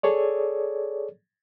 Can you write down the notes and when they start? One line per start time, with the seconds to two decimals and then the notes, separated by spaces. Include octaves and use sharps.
0.03 G#4 A4 C#5 D5